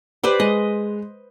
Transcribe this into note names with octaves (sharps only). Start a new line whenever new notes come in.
G4 B4 C5 D5
G#3 D#5